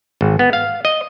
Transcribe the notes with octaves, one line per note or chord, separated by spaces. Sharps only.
G#1
B3
F5
D#5